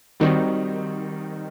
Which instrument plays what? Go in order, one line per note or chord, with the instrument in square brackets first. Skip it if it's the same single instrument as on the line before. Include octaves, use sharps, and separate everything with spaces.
[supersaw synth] D#3 [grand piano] G3 C4 D#4 F#4